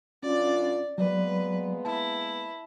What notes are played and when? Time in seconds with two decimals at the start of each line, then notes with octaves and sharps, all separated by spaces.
0.23 F#2 C#4 D4 F4 D5
0.98 F#3 G#3 A#3 B3 B4 D5
1.85 E4 A5